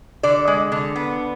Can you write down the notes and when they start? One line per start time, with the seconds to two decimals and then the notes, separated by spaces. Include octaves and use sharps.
0.23 D3 D5
0.48 G#3
0.72 D3
0.96 B3